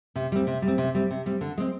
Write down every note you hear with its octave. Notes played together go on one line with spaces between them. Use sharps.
C3
G3 C4
C3
G3
C4
C3
G3 C4
C3
G3 C4
D3
G#3 C4